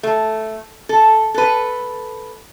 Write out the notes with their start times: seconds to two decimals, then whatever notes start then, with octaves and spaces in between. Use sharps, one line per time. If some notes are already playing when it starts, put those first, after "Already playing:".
0.03 A3
0.89 A4
1.34 A4 B4